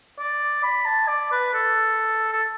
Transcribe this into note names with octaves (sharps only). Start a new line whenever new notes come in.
D5
B5
A5
D5
B4
A4
A4